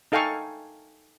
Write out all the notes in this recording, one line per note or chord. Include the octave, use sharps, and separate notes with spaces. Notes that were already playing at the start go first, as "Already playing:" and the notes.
D#4 A4 F5 G5 G#5 C#6